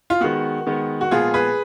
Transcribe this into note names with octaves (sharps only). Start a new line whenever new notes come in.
F4
D#3 G#3 B3 F#4
D#3 G#3 B3
F#4
A#2 F3 G#3 B3 F4 G#4
G#4 B4